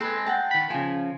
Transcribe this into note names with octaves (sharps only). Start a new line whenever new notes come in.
G#3 C4 A4 B4
F#5 G5 A5
D#3 B5
C#3 F3 G#5